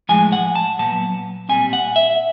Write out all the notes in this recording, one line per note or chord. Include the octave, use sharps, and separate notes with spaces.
A2 F3 G#3 G#5
F#5
A5
A#2 F#3 B3 A5
A#2 G3 C4 G#5
F#5
E5